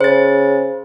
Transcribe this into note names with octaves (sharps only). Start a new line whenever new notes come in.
C#3 C5 A6